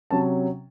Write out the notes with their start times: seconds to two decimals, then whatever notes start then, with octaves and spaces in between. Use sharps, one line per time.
0.11 C3 F#3 C#4 A5